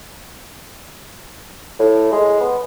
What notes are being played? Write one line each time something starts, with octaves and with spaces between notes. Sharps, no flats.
A2
G#3
B3